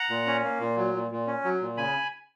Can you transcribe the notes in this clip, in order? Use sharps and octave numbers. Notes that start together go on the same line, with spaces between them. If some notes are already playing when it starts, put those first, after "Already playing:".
Already playing: F#5 A#5
A#2
C#4
A#3
A#2
F#3
A#2
A#2
C#4
F#3
A#2
C#3 G#5 B5